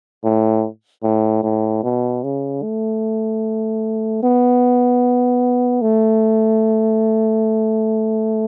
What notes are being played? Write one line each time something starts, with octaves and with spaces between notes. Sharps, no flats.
A2
A2
A2
B2
C#3
A3
B3
A3